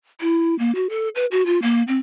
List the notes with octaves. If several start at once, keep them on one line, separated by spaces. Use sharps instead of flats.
E4
A#3
F#4
A4
B4
F#4
F4
A#3
C4